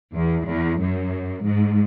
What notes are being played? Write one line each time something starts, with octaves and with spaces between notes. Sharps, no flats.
E2
E2
F#2
G#2